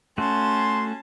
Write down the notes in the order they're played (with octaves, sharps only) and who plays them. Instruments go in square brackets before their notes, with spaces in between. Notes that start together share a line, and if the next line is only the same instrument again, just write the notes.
[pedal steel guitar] A3 F#4 [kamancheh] C#4 A5 [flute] C6